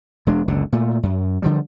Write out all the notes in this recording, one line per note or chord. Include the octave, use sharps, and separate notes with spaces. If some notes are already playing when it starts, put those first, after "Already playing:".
E1 G#3 D4
F#1 C#2 D3
A#2 A3
F#2
D3 F3 G3